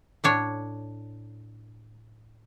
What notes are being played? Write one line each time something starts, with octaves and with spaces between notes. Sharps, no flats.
A2 D4 C#5